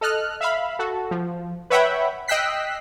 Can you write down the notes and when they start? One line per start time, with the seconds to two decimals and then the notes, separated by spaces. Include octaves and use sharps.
0.01 A4 D#5 F6 F#6
0.41 E5 F5 B5
0.79 F#4 A4
1.11 F3
1.70 B4 C#5 E5 F#5 G5 B5
2.28 D#5 G5 E6 F#6 B6 C7